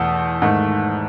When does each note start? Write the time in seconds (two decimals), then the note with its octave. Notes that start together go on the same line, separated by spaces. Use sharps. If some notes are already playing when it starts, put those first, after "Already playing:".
Already playing: E2 B2 A3 D#6 E6
0.42 G#2 D#3 A3